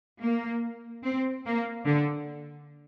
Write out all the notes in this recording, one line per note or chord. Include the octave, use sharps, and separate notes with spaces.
A#3
C4
A#3
D3